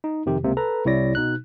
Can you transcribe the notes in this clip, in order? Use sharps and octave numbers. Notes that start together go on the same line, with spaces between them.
D#4
F2 C3 D#3 G4
C#2 C3 A#3
A4 B4 A#5
C2 C3 E4 C#5 D5 A#6
B2 D#4 F#6